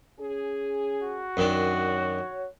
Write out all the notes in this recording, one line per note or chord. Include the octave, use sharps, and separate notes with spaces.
C#4 G#4
F#4
F#2 D#3 D4
C#5